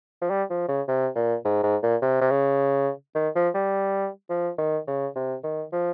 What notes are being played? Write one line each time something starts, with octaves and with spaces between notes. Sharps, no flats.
F3
G3
F3
C#3
C3
A#2
G#2
G#2
A#2
C3
C3
C#3
D#3
F3
G3
F3
D#3
C#3
C3
D#3
F3